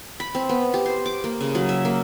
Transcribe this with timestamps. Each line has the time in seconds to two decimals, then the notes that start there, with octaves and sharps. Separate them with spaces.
0.20 B5
0.35 C4
0.49 B3
0.74 G4
0.86 C5
1.06 D6
1.24 A#3
1.41 C#3
1.55 F#3
1.69 E5
1.85 A#3